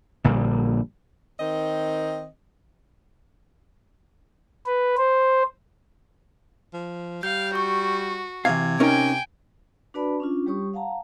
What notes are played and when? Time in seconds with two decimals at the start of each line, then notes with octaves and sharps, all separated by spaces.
0.24 A#1 A#2 D3 G3
1.39 D#3 C4 D#5
4.66 B4
4.97 C5
6.73 F3
7.23 G3 F5 G6
7.55 F#4 C#6
8.45 C3 E3 F5 G#6
8.80 C#4 D#4 A#4 G5 G#5
9.94 D4 F#4 B4 D5 A5 B5
10.20 C#4 D4 F4
10.46 G3 G4 C#5 C#6 D#6
10.74 F5 F#5 A5 A#5